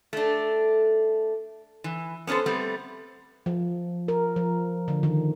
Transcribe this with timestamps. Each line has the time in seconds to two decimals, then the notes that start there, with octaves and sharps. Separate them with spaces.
0.13 A3 D4
1.84 E3
2.27 B3 C#4 D4 A4 C5
2.46 G3 A3 B3 C4
3.46 F3
4.08 A#4
4.36 F3
4.88 D3
5.03 D#3